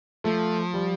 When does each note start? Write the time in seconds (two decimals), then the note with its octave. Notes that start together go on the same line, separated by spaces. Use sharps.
0.24 F3 A3
0.74 G3